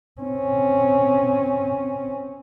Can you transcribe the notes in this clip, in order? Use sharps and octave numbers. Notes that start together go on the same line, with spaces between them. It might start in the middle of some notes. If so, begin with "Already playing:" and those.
C4 C#4